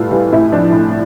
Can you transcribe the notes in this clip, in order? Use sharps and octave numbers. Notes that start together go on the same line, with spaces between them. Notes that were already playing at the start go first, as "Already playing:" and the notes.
Already playing: A2 G3 F4 A4 B4
E3 G3
A2 E4
F3 D4
A2